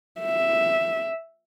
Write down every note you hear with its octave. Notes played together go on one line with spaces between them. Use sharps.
E5